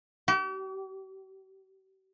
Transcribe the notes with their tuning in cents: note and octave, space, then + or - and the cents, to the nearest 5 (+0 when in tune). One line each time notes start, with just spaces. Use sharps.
G4 -45